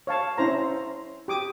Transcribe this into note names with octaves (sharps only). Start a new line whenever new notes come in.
C#5 F5 A5
C#4 E4 C5 A#5
G4 D6 D#6